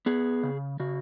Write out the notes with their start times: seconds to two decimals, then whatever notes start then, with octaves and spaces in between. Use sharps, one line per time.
0.06 B3 G#4
0.43 C#3
0.80 C#3 F#4